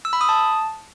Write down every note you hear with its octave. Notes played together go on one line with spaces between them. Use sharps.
E6
B5
D#6
A5